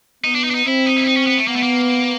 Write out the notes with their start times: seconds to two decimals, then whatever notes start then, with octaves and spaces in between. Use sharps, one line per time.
0.24 B3 D#4
0.35 D4
0.44 D#4
0.50 D4
0.55 D#4
0.65 C4 E4
0.86 D#4
0.97 E4
1.06 D#4
1.17 C#4
1.27 B3
1.37 A3
1.48 A#3 B3
1.56 A3
1.63 A#3